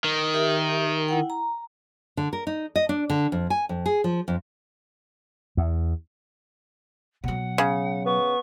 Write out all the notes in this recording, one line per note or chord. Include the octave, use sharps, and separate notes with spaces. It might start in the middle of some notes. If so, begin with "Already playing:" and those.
D#3
G4 A#4 E5
E4 F#5 G5
A#5
D3
A#4
D#4
D#5
D4
D3
F2
G#5
F2
G#4
F3
F2
E2
B2 F#3 F#5
C#3
B3 C#6